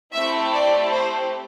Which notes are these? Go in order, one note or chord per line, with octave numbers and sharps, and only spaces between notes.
A3 C4 E4 G4 E5
D5
C5